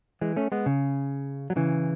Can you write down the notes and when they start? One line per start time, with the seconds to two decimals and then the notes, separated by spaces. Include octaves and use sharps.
0.21 E3 G#3
0.36 A3 C#4
0.52 G#3 B3
0.66 C#3
1.50 F#3
1.56 C#3 E3